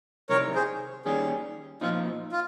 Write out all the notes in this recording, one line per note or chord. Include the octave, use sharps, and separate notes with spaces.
C2 C3 D#3 G3 C4 A#4 C#5
G#4 C5
D#2 D#3 G3 C#4 G#4
A#2 F3 C4 D#4 F4
F4